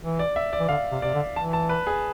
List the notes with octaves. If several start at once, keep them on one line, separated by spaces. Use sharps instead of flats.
E3
D5
E5
D5
E3
D3 F5
C3
C3 D5
D3
E3 A5
A5
B4
G#4